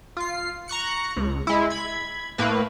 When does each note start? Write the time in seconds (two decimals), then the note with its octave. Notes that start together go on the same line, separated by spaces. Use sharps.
0.17 F4 C7
0.68 A#5 C#6 F#6 C#7
1.16 C#2
1.47 G#3 E4
1.70 B5 G#6
2.38 A2 A#3 B4